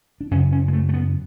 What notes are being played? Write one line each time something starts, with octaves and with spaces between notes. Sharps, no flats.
D4
F#2 C#3 C#4
C#4
G#3
A3
A3
B3